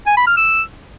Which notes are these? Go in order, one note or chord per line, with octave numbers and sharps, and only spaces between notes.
G#5
B5
F6
E6